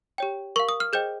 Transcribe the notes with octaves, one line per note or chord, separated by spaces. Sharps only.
G4 C#5 G5
A#4 F5 C#6
D#6
F6
G#4 C5 D#5 G5 G6